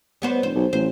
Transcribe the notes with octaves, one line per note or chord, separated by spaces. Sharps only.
G3 B3 C5
F1 C5
B1
A1 C5